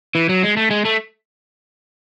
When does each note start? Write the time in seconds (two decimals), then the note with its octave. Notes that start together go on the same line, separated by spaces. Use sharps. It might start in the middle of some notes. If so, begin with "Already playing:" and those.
0.15 E3
0.29 F#3
0.43 G#3
0.57 A3
0.70 G#3
0.85 A3